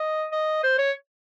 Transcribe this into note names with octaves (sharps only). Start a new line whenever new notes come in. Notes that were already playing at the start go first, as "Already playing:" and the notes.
Already playing: D#5
D#5
C5
C#5